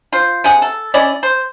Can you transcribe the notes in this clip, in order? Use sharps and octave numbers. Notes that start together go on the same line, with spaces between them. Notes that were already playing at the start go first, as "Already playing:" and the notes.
F4 C5
C3 G#4 F#5
A4
C#4 E4 D5 D#5
C5